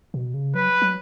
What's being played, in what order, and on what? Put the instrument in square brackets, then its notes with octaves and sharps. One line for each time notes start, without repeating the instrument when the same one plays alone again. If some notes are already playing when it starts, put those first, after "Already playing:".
[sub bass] B2
C#3
[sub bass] F#3 [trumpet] B4
[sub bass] F#3